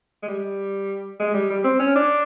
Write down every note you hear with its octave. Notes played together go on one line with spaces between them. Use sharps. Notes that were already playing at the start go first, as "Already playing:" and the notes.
G#3
G3
G#3
G3
G3
C4
C#4
D4